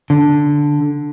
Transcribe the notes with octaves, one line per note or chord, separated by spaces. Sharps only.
D3